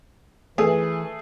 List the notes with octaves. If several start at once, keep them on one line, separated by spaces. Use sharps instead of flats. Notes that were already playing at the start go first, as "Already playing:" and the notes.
E3 A3 G#4